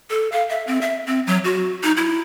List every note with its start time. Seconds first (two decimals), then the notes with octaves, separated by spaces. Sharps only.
0.10 A4
0.32 F5
0.49 E5
0.67 C4
0.81 E5
1.07 C4
1.27 F#3
1.44 F#4
1.83 D#4
1.97 E4